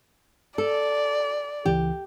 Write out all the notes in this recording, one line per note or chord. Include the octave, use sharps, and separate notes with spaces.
A4 D5
C#2 E3 G4